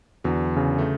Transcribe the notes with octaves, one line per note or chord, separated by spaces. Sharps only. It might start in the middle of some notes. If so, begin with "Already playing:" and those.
E2 D3 F#3
C#3
A3